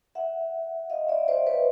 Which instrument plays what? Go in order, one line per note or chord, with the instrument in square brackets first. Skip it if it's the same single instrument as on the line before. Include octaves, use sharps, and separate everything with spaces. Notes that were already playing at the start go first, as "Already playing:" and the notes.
[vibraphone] E5 F#5
D#5 F5
D5 E5
C5 D5
B4 C#5